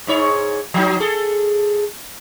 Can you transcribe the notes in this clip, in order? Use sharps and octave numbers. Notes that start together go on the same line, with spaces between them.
G#2 D#4 C#5
F3 F#3 D#4
G#4 A4